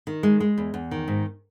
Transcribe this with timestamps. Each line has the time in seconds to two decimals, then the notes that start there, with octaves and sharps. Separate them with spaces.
0.07 D#3
0.23 G#3
0.40 G#3
0.58 E2
0.74 E2
0.91 D#3
1.08 G#2